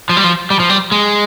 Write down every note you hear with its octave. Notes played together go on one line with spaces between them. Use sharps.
F3
G3
F3
G3
F3
G3
G#3